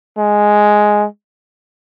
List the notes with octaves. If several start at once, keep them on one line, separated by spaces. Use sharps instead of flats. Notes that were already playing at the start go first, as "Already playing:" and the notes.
G#3